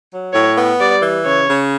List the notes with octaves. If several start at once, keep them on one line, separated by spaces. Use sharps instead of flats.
F#3
A2 C#5
B3
G3 D5
E3
C#3 C#5
C#3